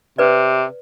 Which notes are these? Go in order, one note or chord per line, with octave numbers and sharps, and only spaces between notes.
C3 B4 D5